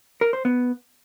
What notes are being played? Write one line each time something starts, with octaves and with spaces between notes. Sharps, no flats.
A#4
C5
B3